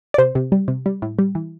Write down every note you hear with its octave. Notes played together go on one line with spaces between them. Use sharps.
D5
C3 C5
C3
G3
C3
G3
A2
G3
E3